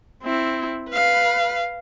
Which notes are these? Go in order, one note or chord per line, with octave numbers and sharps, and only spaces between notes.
C4 E4
B4 F5